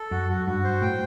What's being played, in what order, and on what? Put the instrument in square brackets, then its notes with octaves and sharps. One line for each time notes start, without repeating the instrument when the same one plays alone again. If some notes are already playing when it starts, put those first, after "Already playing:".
Already playing: [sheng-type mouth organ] A4
[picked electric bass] F#2 [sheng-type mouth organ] F#4
[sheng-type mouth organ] F#4
[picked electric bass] G2 [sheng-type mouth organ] F#4
[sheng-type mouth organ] C5
[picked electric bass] A2 [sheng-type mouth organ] G5